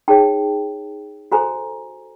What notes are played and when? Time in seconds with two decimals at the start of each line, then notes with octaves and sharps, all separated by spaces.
0.08 D#4 G#4 C#5 G5 A5
1.32 F#4 A4 C5 G#5 A#5